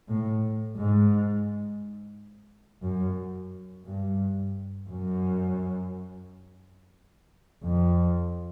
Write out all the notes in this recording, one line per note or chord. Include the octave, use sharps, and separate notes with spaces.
A2
G#2
F#2
G2
F#2
F2